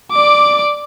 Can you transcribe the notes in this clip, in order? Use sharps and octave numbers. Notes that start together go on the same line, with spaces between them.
D5 D6